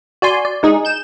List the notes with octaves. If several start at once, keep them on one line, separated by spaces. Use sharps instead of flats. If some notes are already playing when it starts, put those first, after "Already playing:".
F#4 D5 G#5 C6
D5
G#3 D#4 G#4
G6 E7